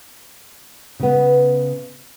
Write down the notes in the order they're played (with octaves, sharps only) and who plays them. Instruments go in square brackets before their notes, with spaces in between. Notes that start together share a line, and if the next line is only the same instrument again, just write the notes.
[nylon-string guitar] C#3 B3